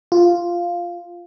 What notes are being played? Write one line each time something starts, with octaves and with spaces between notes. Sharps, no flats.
F4